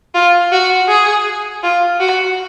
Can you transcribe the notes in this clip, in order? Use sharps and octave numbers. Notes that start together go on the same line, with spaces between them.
F4
F#4
G#4
F4
F#4